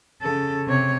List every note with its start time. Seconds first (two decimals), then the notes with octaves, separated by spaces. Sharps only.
0.22 C#3 A4
0.66 C3 C#5